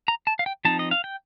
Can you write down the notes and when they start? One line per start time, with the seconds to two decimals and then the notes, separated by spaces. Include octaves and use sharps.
0.08 A#5
0.27 A5
0.39 F5
0.46 G5
0.65 F3 C4 D#4 A5
0.79 D#5
0.91 F5
1.04 G5